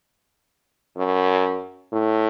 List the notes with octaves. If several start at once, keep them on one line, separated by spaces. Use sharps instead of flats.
F#2
A2